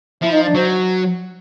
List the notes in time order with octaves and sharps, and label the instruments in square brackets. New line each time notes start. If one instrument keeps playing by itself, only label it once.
[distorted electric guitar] F3 [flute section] E4 E5
[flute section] D#4 D#5
D4 D5
[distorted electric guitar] F#3 [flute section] C5